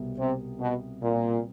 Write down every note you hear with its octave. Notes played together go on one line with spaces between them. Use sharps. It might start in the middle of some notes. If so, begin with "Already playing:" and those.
Already playing: C2 B2 G3 B3
C3
B2
A#2